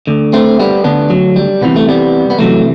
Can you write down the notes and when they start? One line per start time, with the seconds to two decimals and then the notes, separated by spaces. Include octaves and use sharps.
0.07 D2 D3
0.33 A3 C4
0.60 G3 B3
0.84 D2 D3 B3 D4
1.10 F#3
1.36 G3
1.61 C2 C3 E3 B3
1.76 A3
1.89 G3 B3
2.30 B3
2.39 C2 C3 E3 F#3 A3